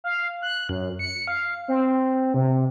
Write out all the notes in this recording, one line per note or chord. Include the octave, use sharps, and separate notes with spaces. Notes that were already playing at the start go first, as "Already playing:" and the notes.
F5
F#6
F#2
C#7
F5
C4
C3